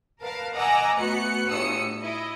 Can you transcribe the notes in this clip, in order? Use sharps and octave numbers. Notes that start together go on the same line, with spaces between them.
A#4 B4 F5 A5
D#5 F#5 G#5 A#5 D6 E6
A3 B3 F#4 F#6 C#7
G1 A2 D#6 E6 C#7
E4 D#5